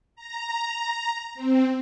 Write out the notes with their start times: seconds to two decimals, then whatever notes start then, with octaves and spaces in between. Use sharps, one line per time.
0.16 A#5
1.35 C4